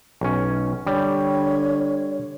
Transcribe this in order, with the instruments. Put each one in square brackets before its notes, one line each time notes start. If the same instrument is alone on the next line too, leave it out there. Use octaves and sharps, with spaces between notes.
[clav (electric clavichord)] B1 C#4
[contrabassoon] D3 [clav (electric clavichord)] G3 [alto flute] C#5